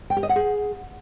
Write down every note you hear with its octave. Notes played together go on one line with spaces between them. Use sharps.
G5
G4
D#5
F#5
G#4